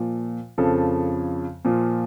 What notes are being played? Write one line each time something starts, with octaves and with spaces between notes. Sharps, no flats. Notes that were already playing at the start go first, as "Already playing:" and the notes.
Already playing: A#2 F3
F2 C#3 F3 A4
A#2 F3